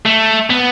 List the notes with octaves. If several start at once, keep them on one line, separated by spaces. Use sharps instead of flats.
A3
B3